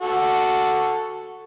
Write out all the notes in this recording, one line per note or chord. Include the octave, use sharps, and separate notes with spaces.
F#4 A4